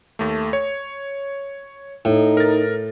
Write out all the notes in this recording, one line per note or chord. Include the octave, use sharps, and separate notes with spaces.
D#2 A3
C#5
A2 D#4
A#4 A6